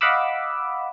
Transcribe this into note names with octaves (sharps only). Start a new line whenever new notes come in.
D#5 F5 F#5 B5 D6 E6